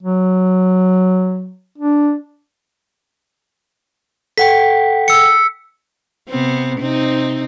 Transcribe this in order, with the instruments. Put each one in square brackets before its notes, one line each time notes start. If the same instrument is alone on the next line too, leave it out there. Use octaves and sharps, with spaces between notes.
[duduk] F#3
D4
[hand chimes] A4 F#5 G5 [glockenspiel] B6
[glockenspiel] E6 C#7
[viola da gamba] C3 B3 C4
C3 C4 D#4